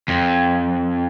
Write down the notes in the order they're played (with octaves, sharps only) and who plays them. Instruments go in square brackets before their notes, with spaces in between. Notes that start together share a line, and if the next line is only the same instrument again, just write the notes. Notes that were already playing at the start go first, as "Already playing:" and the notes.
[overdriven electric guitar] F2